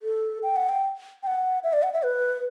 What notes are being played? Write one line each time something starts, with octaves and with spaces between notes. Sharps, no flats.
A4
G5
F#5
G5
G5
F#5
E5
D5
F#5
E5
B4